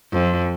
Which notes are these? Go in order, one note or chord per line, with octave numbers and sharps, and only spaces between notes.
F2